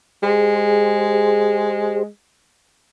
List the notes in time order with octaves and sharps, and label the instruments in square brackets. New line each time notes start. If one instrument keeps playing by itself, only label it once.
[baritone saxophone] G#3 [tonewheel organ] G4 G#4 C5